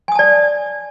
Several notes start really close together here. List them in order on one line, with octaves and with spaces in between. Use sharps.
G#5 D#6 A5 D5